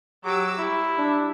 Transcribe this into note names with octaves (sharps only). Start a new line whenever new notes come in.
F#3 G4 D6 E6
G3 E4
D4